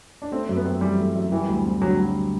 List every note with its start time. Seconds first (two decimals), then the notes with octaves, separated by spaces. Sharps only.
0.22 D4
0.32 A3 C4
0.49 F#2
0.57 B3
0.66 C4
0.81 E3 G3
0.98 A3
1.15 F#2
1.32 E3 G3
1.48 D2
1.65 C4
1.82 D3 F#3
1.98 G3